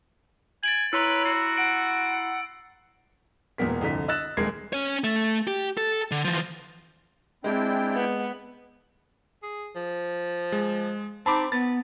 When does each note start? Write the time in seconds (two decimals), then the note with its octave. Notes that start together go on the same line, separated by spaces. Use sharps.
0.63 G#5 A6 D7 F#7
0.93 E4 B4 C#5 A#5 C6 E6
1.25 F#4 C7
1.58 F#5 D7
3.58 E1 A#2 B3 A#4 B6
3.81 C2 F2 D3 B6
4.08 D#5 E6 F#6 A6 E7
4.37 D#1 G#3 A#4 G#6 C7
4.73 C#4 C#5
5.04 A3
5.47 G4
5.77 A4
6.12 D3
6.25 E3 F3
7.44 G#3 C4 D4 E4 G5
7.95 B3
9.43 G#4
9.76 F3
10.52 G#3
11.26 C4 D#4 A5 B5 D6
11.52 B3 B4 A6